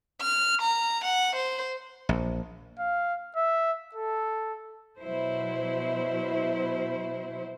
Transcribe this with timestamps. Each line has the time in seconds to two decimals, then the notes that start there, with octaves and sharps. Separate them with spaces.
0.22 F6
0.62 A#5
1.05 F#5
1.36 C5
2.09 A#1
2.79 F5
3.36 E5
3.95 A4
5.01 B2 F#3 E4 C5